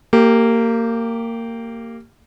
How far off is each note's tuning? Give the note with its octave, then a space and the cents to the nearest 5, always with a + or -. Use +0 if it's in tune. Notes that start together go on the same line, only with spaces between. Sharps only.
A#3 -20 G4 +0